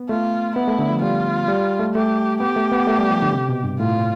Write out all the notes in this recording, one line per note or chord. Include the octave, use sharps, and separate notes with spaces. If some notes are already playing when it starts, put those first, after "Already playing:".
Already playing: B3
A3 F4
B3 E4
A3
D3
F3
G3 F4
G3
A3
A3 G4
B3 G4
A3
B3
A3
G3
F3
D3
C3
B2
G2
A2 F4